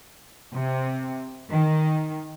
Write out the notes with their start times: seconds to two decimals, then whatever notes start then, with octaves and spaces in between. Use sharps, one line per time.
0.55 C3
1.50 D#3